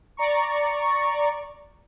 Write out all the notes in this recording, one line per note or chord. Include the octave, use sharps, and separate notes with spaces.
D5 A#5 C#6